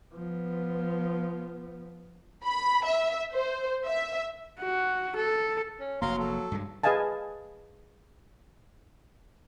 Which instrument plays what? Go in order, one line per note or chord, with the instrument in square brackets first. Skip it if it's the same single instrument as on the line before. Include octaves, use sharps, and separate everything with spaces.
[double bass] F3 B3
[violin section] B5
E5
C5
E5
[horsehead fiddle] F#4
A4
[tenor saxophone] C#4
[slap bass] F1 A#3 [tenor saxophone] F#3 [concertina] F5 A#5 C6
[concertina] A4
[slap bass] G2 G#3
[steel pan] G#4 B4 D#5 F5 G#5 A5